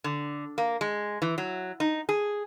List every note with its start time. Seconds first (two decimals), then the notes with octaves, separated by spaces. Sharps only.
0.04 D3
0.58 A#3
0.81 G#3
1.22 E3
1.38 F#3
1.80 D#4
2.09 G#4